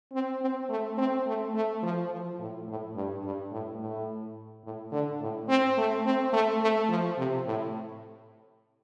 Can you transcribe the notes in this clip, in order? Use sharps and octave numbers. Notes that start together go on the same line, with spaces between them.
C4
C4
A3
C4
A3
A3
F3
F3
A2
A2
G2
G2
A2
A2
A2
D3
A2
C4
A3
C4
A3
A3
F3
C3
A2